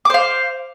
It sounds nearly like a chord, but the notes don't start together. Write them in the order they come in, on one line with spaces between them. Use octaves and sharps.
D6 C5 F5